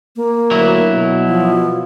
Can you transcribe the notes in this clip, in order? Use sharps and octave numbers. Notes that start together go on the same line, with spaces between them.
A#3
D2 F#3 E4
B2
F3